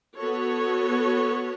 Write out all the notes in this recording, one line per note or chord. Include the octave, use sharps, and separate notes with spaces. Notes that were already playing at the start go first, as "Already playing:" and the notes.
B3 F#4 A4 C#5